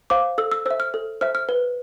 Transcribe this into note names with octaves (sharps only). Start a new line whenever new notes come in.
C5 F5 D6
A4 E6
E6
C5 E5 E6
F6
A4
C5 E5 F6
F6
B4